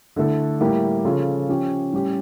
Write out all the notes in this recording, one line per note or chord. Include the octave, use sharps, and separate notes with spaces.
D3 A3 E4 A4
A2 G3 A#3 E4 G4
C#3 F3 C#4 F4 A4
F3 C#4 G4
A2 G3 C#4 G4